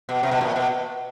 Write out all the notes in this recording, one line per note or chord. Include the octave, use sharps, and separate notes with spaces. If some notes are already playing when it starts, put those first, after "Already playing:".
B2
C3
B2
A#2
B2